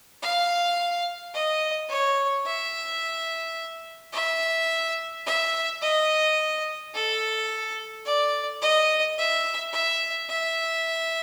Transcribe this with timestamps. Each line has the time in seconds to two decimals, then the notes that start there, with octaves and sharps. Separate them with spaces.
0.22 F5
1.34 D#5
1.89 C#5
2.46 E5
4.13 E5
5.26 E5
5.81 D#5
6.94 A4
8.05 D5
8.62 D#5
9.18 E5
9.73 E5
10.29 E5